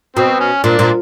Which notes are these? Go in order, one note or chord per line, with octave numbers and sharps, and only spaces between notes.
B2 C4
C#4
A#2 D4
A#2